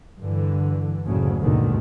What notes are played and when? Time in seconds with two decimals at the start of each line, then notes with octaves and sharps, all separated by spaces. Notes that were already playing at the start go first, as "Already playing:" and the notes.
0.21 G2 D3 E3
1.06 F#1 D2 A2 C#3
1.40 G#1 D#2 B2 D3 D#3